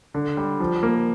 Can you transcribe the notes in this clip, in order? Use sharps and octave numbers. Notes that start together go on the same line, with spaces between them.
D3
G3
F3
A#3